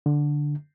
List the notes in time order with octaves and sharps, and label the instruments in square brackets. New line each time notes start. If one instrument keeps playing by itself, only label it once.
[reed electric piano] D3